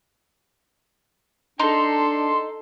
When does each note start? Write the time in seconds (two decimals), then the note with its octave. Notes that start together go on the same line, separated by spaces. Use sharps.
1.60 D4 D#4 A4 C6